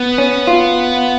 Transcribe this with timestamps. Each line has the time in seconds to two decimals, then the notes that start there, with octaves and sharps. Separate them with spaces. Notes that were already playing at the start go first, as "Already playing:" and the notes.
Already playing: B3
0.18 C#4
0.47 F4